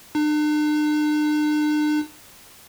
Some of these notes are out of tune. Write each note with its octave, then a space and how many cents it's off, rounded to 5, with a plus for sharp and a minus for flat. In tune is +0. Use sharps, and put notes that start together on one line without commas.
D4 +45